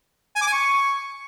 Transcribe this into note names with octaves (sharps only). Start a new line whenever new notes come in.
G#5
D6
G#5
C#6